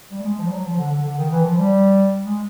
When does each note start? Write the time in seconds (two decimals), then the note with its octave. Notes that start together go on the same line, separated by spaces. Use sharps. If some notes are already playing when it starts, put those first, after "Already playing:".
0.11 G3
0.20 A3
0.25 G#3
0.38 F3
0.47 G3
0.51 F#3
0.65 F3
0.78 D3
0.91 D3
1.04 D3
1.18 D#3
1.32 E3
1.45 F3
1.58 G3
2.25 G#3